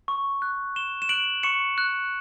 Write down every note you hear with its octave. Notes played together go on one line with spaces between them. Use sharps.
C#6
F#6
C#6 E7 G7
E7
F#6 D7 F#7
C#6 C#7 E7
F#6